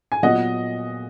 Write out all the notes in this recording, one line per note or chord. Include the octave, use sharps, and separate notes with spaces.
G#5
A#2 F#3 B3 D#5 F#5